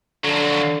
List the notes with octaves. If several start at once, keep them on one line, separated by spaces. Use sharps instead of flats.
D3 F3 F#3